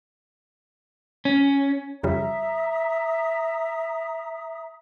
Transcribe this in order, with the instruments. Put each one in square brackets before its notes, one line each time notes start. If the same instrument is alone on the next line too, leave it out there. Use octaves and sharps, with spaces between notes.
[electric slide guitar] C#4
[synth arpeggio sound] F2 C#3 G3 [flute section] E5 A#5 D#6